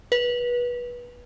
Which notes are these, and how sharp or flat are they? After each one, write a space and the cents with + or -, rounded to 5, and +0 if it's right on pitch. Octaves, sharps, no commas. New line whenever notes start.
B4 -25